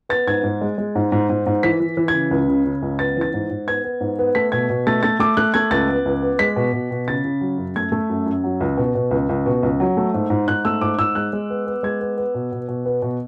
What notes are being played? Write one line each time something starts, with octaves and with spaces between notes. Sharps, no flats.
B3 A6
G#2 G#6
G#2
G#3
G#3
G#2
G#2
G#2
G#2
E3 B6
E3
E3
G#6
C#3
C#2
C#3
C#3
C#2
B3 A6
E3 A6
G#2
G#2
B3 G#6
B3
G#2
B3
A3 B6
B2 G#6
B2
A3 A6
A3 A6
A3 D6
A3 F#6
A3 G#6
C#2 A6
B3
C#2
B3
G#3 B6
B2
B2
B2
C#3 A6
C#3
F#3
F#2
A3 G#6
A3
F#2
F#2
F#3
C#2
B2
B2
C#2
C#2
B2
C#2
F#3
A3
G#2
G#2
G#2 F#6
A3 E6
G#2 D6
G#2 E6
G#3 F#6
G#3
B3
B3
G#3 G#6
B3
B3
B2
B2
B2
B3
B2